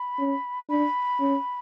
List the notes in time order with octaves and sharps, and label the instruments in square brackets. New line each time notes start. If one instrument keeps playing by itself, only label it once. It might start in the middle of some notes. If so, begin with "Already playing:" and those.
Already playing: [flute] B5
[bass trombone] C#4
[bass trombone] D4 [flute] B5
[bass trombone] C#4